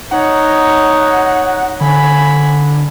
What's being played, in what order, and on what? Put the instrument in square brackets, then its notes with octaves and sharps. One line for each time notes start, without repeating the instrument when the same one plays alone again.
[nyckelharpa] D#4 C#5 [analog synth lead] F#5
[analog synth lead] D3 [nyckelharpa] G#5 B5